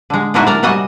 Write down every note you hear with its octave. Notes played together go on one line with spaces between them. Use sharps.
D3 G#3
A#2 D3 G#3 D#4 E4 F#4
A#4 D5
C3 G3 F#4 D#5 G#5